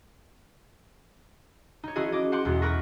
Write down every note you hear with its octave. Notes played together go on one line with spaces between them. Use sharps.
D#4 C#5
F3 C#4 E4 F#4 G#4 D#5
D#5 D6
C5 F#5 C6 D6
B1 E2 G#3
A#4 B4 C#6 A#6